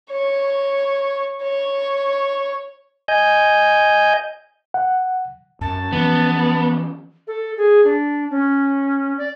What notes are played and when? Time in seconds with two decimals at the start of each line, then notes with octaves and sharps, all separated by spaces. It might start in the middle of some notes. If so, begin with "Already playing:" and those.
0.11 C#5
1.43 C#5
3.08 D#5 G#5 G6
4.74 F#5
5.61 F#2 A5
5.93 E3 F3 B3 C#4
7.27 A4
7.57 G#4
7.85 D4
8.30 C#4
9.18 D5